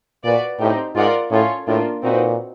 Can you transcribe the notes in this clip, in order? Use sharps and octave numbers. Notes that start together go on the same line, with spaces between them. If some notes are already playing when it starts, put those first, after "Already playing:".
A#2 F#4 B4 D5
A2 C4 D#4 G4
G#2 F4 A#4 D5 F#5
A2 C#4 F4 A4 C#5
A2 A#3 D4 F4
A#2 C4 D#4 F#4 B4